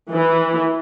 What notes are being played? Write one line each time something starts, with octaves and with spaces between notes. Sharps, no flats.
E3